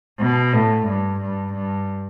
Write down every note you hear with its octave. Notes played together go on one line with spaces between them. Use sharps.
B2
A2
G2
G2
G2